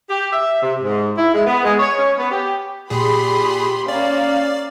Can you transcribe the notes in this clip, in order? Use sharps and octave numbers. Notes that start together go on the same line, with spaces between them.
G4
E5
C3
G#2
E4
G#3
B3
G#3
C#5
C#4
B3
G4
A#2 G4 G#4 B5 C6
A#3 C#4 D5 F5